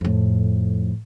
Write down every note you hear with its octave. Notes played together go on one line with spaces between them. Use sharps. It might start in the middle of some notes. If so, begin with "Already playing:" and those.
F2 A2